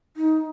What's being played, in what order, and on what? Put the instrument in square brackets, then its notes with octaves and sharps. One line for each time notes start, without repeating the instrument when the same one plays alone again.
[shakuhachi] D#4